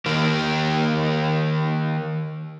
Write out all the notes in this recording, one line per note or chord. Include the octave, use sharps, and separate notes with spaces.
D#3 A#3 G4 A#4